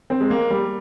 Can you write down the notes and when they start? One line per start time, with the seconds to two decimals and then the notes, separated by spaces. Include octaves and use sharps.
0.10 C4
0.21 G#3
0.30 A#3
0.50 G3